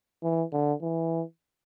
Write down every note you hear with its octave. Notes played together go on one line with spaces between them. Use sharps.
E3
D3
E3